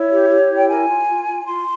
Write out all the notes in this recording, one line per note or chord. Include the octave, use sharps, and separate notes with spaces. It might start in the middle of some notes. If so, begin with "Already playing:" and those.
Already playing: E4 C#5
G4
G4
E4
G5
A#4 G#5
F4
F4
F4
F4 C6